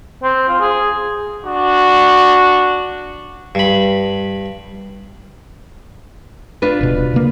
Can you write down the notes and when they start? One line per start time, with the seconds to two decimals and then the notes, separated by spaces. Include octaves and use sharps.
0.23 C4
0.49 F4
0.61 G#4
1.44 D4 F#4
3.55 G2 B5
6.62 D4 F4 B4
6.81 D#1 B2
7.14 C#3 A#3